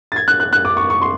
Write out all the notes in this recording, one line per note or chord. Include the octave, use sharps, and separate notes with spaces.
A6
G#6
F#6
F#6
F#6
D6
C#6
C#6
C6